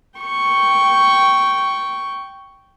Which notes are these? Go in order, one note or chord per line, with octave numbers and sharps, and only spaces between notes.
G5 C#6